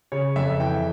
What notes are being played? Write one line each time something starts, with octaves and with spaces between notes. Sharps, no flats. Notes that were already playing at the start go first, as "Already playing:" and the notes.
C#3 C#5
F2 E5
E3 G5